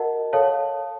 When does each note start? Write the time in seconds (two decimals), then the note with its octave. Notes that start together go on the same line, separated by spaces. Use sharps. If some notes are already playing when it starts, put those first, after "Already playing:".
Already playing: F#4 A#4 D#5 F#5 A5
0.33 A4 C#5 F5 A5